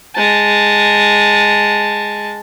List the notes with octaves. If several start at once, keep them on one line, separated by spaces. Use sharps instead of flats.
G#3 A5